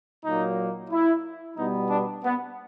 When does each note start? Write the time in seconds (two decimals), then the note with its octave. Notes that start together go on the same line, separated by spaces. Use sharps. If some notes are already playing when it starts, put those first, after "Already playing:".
0.24 A#2 F#3 A#3 D#4
0.91 E4
1.56 B2 G3 B3 D#4
1.89 D4
2.23 B3